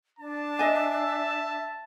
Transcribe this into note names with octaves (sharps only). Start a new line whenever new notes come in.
D4 A5
D#5 E5 G#5